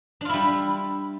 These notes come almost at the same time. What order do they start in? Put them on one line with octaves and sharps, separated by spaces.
D4 F4 E4 G3